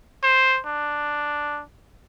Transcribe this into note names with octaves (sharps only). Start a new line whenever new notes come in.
C5
D4